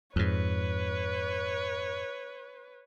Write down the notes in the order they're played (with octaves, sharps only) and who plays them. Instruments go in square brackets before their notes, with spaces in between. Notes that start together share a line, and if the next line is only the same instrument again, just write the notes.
[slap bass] F2 G#2 [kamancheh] B4 C#5